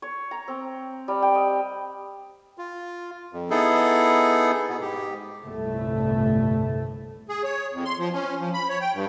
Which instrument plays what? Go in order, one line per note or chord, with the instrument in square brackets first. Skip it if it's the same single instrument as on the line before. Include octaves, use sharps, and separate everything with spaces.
[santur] C#5
A#5
C4
G3
G5
D#5
[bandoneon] F4
F2
B3 D#4 E4 G#4 A4
B2 B3
G#2 G4
[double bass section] G1 C2 A2 A3
[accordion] G#4
C#5
F2
C6
F3
C#4
F3
B5
C#5
G5
G2